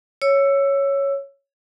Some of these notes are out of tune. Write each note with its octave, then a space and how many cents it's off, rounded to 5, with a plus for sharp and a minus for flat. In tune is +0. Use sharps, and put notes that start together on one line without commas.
C#5 +0 E6 +15